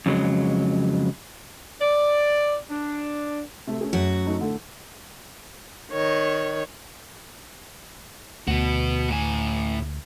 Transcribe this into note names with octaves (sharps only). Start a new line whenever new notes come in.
F2 C#3 F#3 G#3
D5
D4
C3 A3
A3 C#4 G#4
F#2 F#4
F#3 A3 D#4
A2 D3 A3
D#3 C#5
D2 B2 F#4
A2 G#5